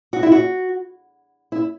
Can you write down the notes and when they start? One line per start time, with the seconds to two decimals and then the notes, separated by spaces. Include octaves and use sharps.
0.13 F#4
0.23 E4
0.32 F#4
1.52 E4